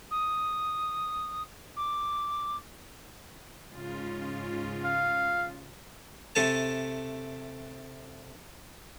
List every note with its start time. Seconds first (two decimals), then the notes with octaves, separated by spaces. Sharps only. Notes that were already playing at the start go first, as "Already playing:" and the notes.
0.10 D#6
1.76 D6
3.73 G#2 C#3 F4
4.84 F5
6.35 C3 A3 A4 G#5 A5